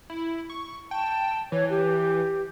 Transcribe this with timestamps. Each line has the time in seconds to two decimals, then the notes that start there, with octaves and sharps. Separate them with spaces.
0.10 E4
0.50 C#6
0.91 G5 A5
1.52 E3 C#5
1.70 G4